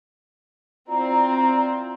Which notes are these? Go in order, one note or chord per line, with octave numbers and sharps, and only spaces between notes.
C4 E4 F4 D5 A#5